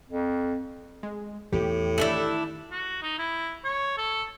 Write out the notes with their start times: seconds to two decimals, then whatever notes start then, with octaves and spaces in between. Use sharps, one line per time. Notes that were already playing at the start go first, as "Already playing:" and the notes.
0.09 F2
1.03 G#3
1.53 E2 A2 G4
1.98 D#3 A3 D4 E4
2.71 F#4
3.02 D#4
3.19 E4
3.64 C#5
3.98 A4